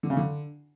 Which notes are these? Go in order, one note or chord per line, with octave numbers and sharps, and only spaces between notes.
D3
C#3
D3